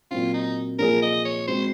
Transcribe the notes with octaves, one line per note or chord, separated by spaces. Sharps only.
A#2 F#3 C4 F4
D#4
A#2 F3 A#3 F4 G#4 A#4
D#5
C#5
G#3 C4 F#4 C5